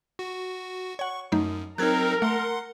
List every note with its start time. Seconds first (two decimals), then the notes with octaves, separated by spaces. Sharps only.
0.19 F#4
0.99 C#5 F#5 C#6
1.32 F#2 F#3 A3 D#4
1.78 F#3 C4 D#4 A#4 F#6 G#6
2.22 A3 F#5 C6